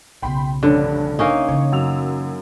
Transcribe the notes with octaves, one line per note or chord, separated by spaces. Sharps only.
B1 C#3 G5 B5 C6
F1 G2 D3 C#4
A#3 C#4 D#4 E5
C#3 E3 C#5
F#2 E6 F7